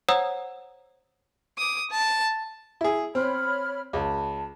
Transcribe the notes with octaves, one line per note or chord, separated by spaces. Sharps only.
C5 C#5 F#5 A#5 D#6 E6
D6 D#6
A5
E4 G#4
C4 C#5 B5 F6
C#2 A5